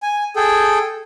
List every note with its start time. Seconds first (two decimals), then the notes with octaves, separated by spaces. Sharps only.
0.03 G#5
0.36 G#4 A4 G5